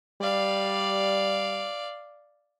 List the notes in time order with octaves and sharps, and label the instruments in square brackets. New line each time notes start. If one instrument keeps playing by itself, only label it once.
[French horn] G3 [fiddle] D5 F5